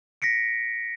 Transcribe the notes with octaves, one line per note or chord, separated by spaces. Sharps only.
A#6 B6 C#7 D7